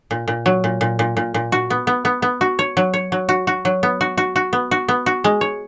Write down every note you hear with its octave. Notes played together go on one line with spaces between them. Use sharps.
A#2
A#2
F#3
A#2
A#2
A#2
A#2
A#2
F#4
B3
B3
B3
B3
F#4
C#5
F#3
C#5
F#3
F#4
F#4
F#3
B3
F#4
F#4
F#4
B3
F#4
B3
F#4
G#3
C#5